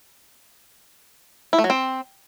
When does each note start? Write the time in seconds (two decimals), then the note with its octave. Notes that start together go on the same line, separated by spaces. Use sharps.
1.53 E4
1.58 A3
1.64 F#3
1.70 C4